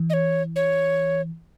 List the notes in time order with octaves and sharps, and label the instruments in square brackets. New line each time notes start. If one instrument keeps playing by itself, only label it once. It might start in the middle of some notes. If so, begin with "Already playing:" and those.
Already playing: [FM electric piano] E3
[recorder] D#5
C#5
C#5